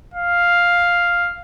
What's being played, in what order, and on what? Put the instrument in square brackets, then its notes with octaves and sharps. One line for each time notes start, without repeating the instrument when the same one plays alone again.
[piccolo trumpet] F5